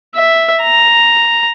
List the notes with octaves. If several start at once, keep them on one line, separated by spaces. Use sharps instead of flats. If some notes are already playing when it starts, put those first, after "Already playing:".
E5
A#5